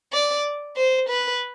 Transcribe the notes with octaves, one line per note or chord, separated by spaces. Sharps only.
D5
C5
B4